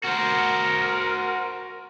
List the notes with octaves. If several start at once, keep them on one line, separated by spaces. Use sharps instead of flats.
F#4 A#4 C5